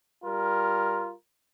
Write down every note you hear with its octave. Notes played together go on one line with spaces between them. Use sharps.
G3 F4 A#4